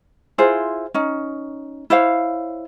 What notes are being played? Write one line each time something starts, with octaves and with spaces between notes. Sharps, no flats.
E4 F4 G#4 C5
C#4 D#4
E4 C5 C#5 F5